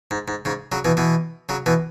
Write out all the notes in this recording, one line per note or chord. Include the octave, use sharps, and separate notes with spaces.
G#2
G#2
G#2 C#3
C#3 F#3
B2 E3
B2 E3
C#3 F#3
B2 E3